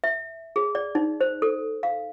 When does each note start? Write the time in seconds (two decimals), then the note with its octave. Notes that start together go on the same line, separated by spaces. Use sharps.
0.04 E5
0.56 G#4
0.75 D5
0.95 D#4
1.21 C5
1.42 A4
1.83 F5